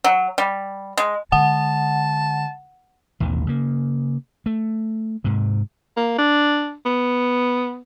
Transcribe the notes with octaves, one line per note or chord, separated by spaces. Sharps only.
F#3
G3
G#3
D3 G#3 F#5 A5
A1 D#2 B2 D#3
C#3 A#3
A3
G#2 C3
A#3
D4
B3